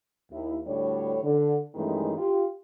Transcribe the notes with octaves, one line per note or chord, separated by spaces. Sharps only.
D#2 E4
D2 A2 G3 D4 C#5
D3
G2 D#3 E3 G#3 A3 C#4
F4 G4